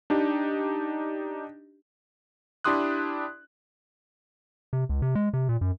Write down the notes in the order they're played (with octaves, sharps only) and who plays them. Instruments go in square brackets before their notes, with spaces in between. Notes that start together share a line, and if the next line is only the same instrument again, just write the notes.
[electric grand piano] D4 D#4 G4
D4 E4 G4 C6 D#6 F#6
[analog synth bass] C3
C#2
C3
G#3
C3
A#2
F#2